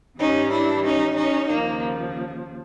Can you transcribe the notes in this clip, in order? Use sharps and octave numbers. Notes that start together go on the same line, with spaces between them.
G#2 E3 G3 C#4 D#4
D4 E4
C#4 D#4
C#4 D#4
D#2 C#3 F3 A#3